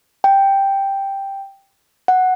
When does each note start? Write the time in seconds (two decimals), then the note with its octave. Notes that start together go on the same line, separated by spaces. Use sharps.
0.24 G5
2.08 F#5